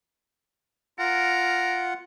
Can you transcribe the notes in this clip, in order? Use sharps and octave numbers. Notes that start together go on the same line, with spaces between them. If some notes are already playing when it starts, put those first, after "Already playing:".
F4 A#4 F#5